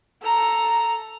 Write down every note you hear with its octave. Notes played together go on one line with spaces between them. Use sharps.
A4 A#5